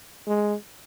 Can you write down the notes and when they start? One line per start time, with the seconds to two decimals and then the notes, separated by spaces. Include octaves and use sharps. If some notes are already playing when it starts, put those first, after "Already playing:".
0.27 G#3